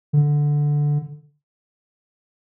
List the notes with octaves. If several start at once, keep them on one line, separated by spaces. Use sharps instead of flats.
D3